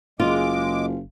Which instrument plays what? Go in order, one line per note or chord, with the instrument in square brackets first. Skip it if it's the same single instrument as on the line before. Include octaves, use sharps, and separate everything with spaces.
[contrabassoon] F#1 [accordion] G#3 D6 [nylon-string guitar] F4